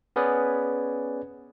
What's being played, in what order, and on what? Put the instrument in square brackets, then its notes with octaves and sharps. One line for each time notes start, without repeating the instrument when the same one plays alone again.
[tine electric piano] B3 C#4 G#4 B4 D5